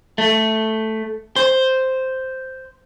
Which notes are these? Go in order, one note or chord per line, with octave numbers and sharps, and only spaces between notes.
A3
C5